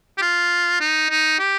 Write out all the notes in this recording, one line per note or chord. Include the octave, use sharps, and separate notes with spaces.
G4
F4
D#4
D#4
G4